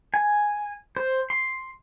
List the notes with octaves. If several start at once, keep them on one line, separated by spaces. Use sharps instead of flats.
G#5
C5
C6